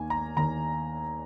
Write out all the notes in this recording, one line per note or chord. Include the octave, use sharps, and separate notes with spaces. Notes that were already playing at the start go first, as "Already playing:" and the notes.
Already playing: D#2 D#3 A#3 G#5
A#5
D#2 D#3 A#3 A#5